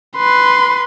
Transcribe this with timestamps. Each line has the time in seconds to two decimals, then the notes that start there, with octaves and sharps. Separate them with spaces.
0.17 B4 C6